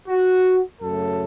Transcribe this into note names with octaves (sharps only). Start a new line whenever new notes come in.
F#4
F#2 C#3 F#3 A3 A4